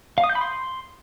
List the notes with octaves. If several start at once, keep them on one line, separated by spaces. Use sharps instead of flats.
F5
D#6
G6
B5
C6